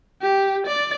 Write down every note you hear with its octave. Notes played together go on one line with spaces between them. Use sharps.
G4
D5